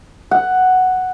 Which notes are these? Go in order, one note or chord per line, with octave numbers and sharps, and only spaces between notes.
F#5